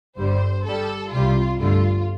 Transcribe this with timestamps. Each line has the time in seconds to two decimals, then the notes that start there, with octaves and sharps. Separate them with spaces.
0.18 G1 G2 D3 G3 C5
0.65 G2 G3 A4
1.12 C2 C3 G3 F4
1.60 G1 G2 D3 A3 F4